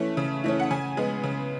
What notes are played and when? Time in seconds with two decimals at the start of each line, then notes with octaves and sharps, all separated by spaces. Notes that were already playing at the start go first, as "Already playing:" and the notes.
Already playing: E3 A3 C#4
0.17 C#3
0.44 E3 A3 C#4
0.60 F#5
0.71 C#3 G#5
0.97 G#3 B3
1.23 C#3